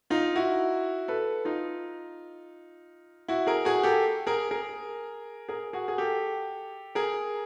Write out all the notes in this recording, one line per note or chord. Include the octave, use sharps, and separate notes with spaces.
D#4 F4
E4 F#4
A4 B4
D#4 F4
E4 F#4
G#4 A#4
F#4 G#4
G4 A4
G#4 A#4
G#4 A#4
G#4 A#4
F#4 G#4
G#4
G4 A4
G#4 A#4